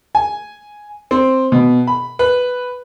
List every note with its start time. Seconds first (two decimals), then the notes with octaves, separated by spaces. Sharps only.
0.15 G#5
1.11 C4
1.52 B2
1.87 B5
2.19 B4